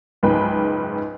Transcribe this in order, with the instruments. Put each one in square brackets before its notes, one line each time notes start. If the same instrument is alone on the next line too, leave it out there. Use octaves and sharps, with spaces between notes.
[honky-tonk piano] F#1 C#2 G#2 B4 G5